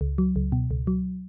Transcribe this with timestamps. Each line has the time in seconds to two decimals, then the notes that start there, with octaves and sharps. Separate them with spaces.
0.01 C#2
0.18 F#3
0.36 C#2
0.52 B2
0.71 C#2
0.87 F#3